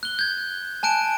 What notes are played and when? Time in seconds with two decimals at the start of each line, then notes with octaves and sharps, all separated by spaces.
0.03 F#6 G7
0.19 G6 G#6
0.83 G#5 A5 F#6 D7